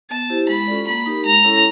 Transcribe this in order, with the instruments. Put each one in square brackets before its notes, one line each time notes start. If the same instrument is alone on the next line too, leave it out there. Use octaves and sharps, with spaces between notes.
[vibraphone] B3 [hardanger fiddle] A5
[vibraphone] E4 G4 C5
[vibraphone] G#3 [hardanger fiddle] B5
[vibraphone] C#4 F4 A4 D5
[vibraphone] A#3 [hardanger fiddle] B5
[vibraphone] D#4 G4 A#4
[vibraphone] G#3 [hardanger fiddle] A#5
[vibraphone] C#4 E4 A4 C#5